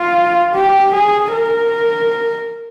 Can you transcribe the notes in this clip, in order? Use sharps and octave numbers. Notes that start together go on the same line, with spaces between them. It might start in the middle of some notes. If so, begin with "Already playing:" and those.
Already playing: F4
G4
G#4
A#4